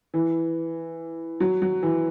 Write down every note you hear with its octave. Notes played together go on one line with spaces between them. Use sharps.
E3
F#3
F#3
E3